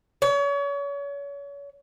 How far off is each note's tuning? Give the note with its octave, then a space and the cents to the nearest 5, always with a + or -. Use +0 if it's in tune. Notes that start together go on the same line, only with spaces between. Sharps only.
C#5 +35